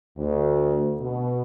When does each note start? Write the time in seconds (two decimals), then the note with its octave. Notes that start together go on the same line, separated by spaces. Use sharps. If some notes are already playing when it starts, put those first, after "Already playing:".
0.16 D2
0.99 B2